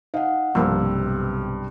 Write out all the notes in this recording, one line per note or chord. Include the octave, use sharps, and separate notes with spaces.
D#4 D#5 F5 F#5
B1 G2 C3 F3 A#3 E6